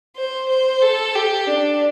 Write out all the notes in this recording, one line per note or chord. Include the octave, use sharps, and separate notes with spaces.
C5
C5
A4
G4
D4